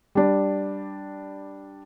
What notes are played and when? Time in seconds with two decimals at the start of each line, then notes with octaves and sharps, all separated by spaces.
0.15 G3 D4